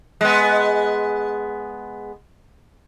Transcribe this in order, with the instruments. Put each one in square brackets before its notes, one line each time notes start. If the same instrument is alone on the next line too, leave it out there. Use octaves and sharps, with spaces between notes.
[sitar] G#3 B3